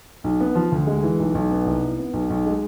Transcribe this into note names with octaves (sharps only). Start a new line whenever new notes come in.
B1
B3
F3
D2
G#3
E3
B1
B1
B3
C2
E4
B3
B1
B1
G#3